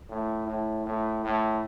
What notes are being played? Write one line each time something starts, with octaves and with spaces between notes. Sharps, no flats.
A2
A2
A2
A2